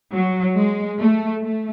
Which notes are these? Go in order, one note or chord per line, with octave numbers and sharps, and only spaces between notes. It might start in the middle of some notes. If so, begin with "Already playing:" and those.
F#3
G#3
A3
A3